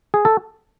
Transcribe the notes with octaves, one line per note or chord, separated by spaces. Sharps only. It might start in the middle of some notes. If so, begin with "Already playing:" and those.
G#4
A4